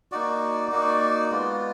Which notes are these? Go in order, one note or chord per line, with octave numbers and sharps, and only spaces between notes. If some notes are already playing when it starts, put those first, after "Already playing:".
A#3 D#4 F#4 D5
A#3 D#4 F#4
G#3 B3 F4